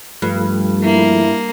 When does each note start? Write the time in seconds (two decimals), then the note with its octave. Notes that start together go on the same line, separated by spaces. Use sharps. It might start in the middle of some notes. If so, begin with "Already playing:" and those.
0.22 G2 F3 A3
0.84 A#3 E4